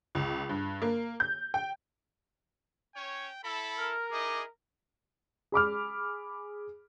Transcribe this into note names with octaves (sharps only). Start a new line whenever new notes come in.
C#2
G2
A#3
G6
G5
C#4 C#5 G5
E4 A4 B5
A#4 F6
D#4 E4 G#4 D#5 D6
G#4 B5 D6 F6